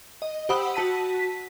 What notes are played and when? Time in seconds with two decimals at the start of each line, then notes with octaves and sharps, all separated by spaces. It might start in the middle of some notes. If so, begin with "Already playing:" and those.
0.22 D#5
0.49 G4 C5 F#5 B5 D#6 E6
0.74 F#4 A5 B6 D#7
1.19 B6